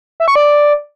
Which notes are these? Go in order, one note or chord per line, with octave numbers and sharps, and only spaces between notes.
E5
C#6
D5